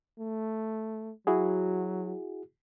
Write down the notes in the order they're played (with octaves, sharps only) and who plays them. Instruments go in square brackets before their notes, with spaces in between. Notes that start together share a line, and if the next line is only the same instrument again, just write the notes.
[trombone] A3
[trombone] F#3 [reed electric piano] E4 F#4 G#4